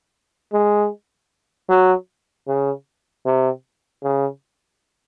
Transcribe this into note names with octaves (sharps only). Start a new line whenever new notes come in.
G#3
F#3
C#3
C3
C#3